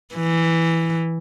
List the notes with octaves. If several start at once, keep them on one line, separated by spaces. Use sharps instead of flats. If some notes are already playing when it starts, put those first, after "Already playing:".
E3